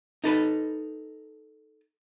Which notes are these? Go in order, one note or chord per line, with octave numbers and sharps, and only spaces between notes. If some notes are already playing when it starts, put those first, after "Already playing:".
D#4 A4 B4